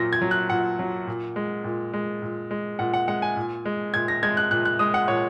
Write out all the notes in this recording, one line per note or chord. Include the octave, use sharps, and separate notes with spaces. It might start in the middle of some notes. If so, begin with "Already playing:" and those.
Already playing: A#2 F#3 A#6
G#6
F#3
F#6
A#2 F#5
F#3
A#2
G#3
A#2
G#3
A#2
G#3
A#2 F#5
F#5
G#3 F#5
G#5
A#2
G#3
A#2 G#6
A#6
G#3 G#6
F#6
A#2 F#6
F#6
G#3 D#6
F#5
A#2 C#5